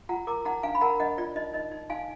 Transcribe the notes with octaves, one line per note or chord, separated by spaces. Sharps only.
F4 F#5 A#5
A#4 A#5 D6
D#4 F#5 A#5
D4 F5 G#5
B5
A#4 F#5 A#5
D4 D#5 F#5
F4 D5
D#4 D#5
D#4 D#5
D#4
D#4 F5 G#5